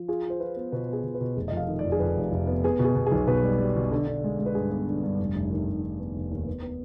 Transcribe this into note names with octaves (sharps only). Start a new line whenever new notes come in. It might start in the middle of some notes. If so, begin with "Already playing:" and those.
Already playing: F3
F4 G#4
F4 C5
F4 B4
B3
B2 B4
B3 G#4
B2
B4
B2
F1 G#4
F2 D#5
F5
D#3
D5
F2
G#4
F2 B4
F1
F1
B3
B3 G#4
B2
G#4
B2
G#4
B1
B2 B4
G3
G3
B2
D3
D3
G#3
G#3
B4
G2 G#4
B3
D3
G2
F1
F1
D#3
F1
F1
B3
F1
D#2
B3
B3